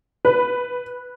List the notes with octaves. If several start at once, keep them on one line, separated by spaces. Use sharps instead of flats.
B4